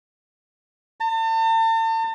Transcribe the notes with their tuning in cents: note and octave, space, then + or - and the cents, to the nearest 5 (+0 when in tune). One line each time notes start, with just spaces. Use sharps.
A5 +40